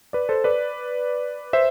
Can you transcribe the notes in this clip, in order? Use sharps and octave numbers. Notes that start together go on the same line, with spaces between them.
B4 D5
A4 C5
B4 D5
C5 E5